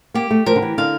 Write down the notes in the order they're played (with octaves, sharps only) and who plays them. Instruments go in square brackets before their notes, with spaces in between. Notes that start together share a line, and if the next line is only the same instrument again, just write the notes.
[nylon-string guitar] A#3 [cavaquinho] G4
[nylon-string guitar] A3
[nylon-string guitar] F3 [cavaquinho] A#4
[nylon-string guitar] D3
E3
[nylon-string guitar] D3 [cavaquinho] F5